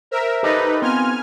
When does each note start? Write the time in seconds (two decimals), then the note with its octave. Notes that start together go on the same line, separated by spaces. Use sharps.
0.11 A#4 C5 E5
0.43 D#4 G4 A4 B4 D#5
0.82 B3 C4 F4 G#5 F6